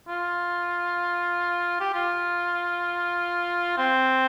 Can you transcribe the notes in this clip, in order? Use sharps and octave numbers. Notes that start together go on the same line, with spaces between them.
F4
G4
F4
C4